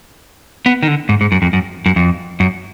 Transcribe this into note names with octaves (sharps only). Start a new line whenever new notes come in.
B3
D#3
D3
G#2
G#2
F#2
F2
F#2
F#2
F2
F#2